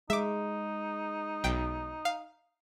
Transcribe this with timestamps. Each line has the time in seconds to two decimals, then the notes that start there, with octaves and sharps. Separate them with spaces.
0.10 G#3 D#4 E5 D6
1.44 B1 G5
2.05 F5